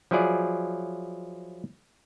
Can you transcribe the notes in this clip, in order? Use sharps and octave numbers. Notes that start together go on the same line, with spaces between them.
F3 F#3 E4 G#4 D5